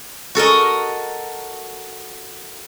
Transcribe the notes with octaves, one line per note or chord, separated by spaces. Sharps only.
F#4 A4 A#4 D#5